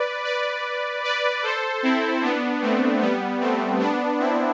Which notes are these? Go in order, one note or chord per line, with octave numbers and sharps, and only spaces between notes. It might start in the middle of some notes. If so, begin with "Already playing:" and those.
Already playing: B4 D5
B4 D5
B4 D5
A4 C5
C4 E4
B3 D4
A3 C4
G3 B3
A3 C4
B3 D4
C4 E4